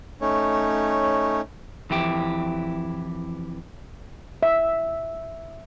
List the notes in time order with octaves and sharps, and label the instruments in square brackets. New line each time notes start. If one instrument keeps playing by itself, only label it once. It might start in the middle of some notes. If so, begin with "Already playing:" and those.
[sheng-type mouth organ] A3 C#4 D#4 C#5
[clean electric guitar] F2 E3 E4 G4
[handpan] E5